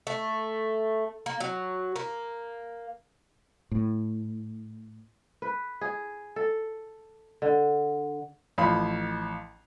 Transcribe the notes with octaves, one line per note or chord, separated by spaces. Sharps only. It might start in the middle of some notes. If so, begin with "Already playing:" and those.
A3
A#3
F#3
A#3
A2
B4
G#4
A4
D3
A1 F3 F5 B5